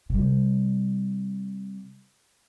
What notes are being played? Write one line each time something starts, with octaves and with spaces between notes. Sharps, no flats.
C3 G3